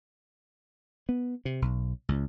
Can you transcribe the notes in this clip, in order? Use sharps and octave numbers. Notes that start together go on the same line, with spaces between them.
B3
C3
B1
C#2